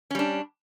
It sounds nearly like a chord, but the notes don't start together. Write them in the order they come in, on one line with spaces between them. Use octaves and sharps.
C#4 G3 D4